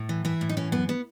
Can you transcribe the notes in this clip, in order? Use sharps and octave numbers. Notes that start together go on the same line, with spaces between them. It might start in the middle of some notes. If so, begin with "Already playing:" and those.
Already playing: A2
E3
E3 E4
A2
D#4
E3 C#4
F#2 B3
B3